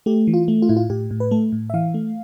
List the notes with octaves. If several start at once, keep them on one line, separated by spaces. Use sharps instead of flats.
A3 G4
E3
F4
A3
F4
A2 E4
F4
A2 G4
A2
B4
A3 A4
A2
E5
E3 F5
A3